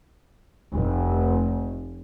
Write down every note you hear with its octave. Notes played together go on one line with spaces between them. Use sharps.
F1